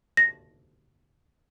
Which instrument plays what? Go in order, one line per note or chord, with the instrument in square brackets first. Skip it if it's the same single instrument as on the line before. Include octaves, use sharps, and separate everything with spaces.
[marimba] A#6